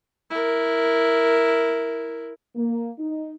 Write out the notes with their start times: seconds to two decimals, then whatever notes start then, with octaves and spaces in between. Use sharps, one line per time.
0.30 E4 A#4
2.56 A#3
2.99 D#4